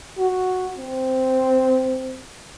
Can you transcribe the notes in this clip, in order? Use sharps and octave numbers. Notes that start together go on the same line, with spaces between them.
F#4
C4